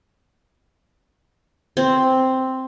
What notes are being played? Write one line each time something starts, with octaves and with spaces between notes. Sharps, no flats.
C4